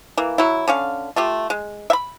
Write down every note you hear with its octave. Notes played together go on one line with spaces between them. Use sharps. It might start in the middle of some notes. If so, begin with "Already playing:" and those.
E3 A#3
F#3 E4
D3 C#4 F5
A3 F4 G4
G#3
E5 B5